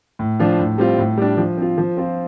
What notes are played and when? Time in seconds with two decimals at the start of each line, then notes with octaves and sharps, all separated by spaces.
0.19 A2
0.39 F3 D4 F4
0.59 A2
0.78 G3 C4 F4
0.98 A2
1.17 G3 D4
1.37 F3
1.57 C4 F4
1.78 F3
1.97 C4 F4